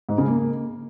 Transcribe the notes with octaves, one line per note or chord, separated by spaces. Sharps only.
G#2
C#3
A#3